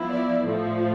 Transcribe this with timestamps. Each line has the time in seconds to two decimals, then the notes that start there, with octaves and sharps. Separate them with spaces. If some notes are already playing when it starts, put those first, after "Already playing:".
Already playing: F3 B3 E4
0.09 D5
0.46 A2 F3 A3